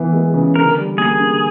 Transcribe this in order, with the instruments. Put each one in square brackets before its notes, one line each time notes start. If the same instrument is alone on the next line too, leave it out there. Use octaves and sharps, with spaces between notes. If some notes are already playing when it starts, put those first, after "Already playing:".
Already playing: [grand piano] E3 B3
G#3
C#3
[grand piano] D3 [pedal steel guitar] A#4
[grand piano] G3
[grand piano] A#3 [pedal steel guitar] G#4
[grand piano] D3